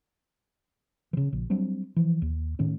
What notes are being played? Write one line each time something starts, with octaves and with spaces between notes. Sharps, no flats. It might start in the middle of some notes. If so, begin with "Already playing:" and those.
C#3 E3
A#1
F#3 G3 C4 D4
E3 F3
D#2
A2 D#3 A3 C#4